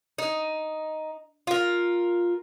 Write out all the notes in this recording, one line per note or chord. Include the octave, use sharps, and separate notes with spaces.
D#4
F4 A#4